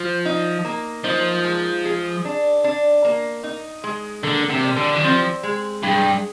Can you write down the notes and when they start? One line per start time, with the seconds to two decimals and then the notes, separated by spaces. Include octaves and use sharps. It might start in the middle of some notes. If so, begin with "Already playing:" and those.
Already playing: F3 F4
0.25 D#4
0.65 A#3
1.04 F3 D#4
1.44 G#3
1.85 G#4
2.25 D4
2.64 D4
3.05 A#3
3.43 D#4
3.84 G#3
4.23 D3 A#3
4.50 C3
4.64 G3
4.76 D3
4.95 D#3
5.03 F3 C4
5.43 G#3
5.83 G2 G#4